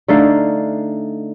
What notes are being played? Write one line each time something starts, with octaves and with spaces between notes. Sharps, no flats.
D3 A3 D#4 F5